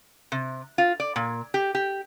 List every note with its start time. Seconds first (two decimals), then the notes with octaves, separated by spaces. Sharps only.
0.32 C3
0.78 F4
1.00 D5
1.16 A#2
1.54 G4
1.75 G4